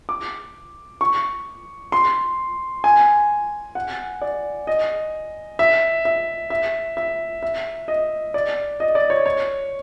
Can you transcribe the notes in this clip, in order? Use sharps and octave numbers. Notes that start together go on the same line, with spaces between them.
D6
C#6
C6
G#5
F#5
D5
D#5
E5
E5
E5
E5
E5
D#5
D5
D#5
D5
C#5
C#5